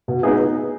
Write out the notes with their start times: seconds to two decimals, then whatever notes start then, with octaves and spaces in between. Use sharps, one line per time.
0.08 B2
0.23 B3 D#4 G#4